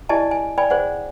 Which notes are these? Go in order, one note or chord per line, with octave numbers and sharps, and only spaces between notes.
E4 G4 D5 D#5 G#5 A5
G#5
D5 G5 G#5 B5
G#4 C5 D5 F#5